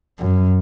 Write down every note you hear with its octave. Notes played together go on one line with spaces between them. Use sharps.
F#2